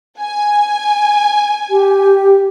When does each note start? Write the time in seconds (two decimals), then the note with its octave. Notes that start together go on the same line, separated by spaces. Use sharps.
0.19 G#5
1.70 G4